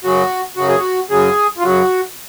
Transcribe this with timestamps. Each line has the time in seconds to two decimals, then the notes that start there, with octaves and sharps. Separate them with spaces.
0.04 F#2 C#3 F#3 F#4
0.56 F#2 C#3 F#3 F#4
0.68 G#4
0.78 F#4
1.10 F#2 C#3 F#3 G#4
1.57 F4
1.63 F#2 C#3 F#3 F#4